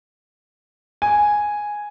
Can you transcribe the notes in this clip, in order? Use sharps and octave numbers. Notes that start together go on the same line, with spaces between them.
G#5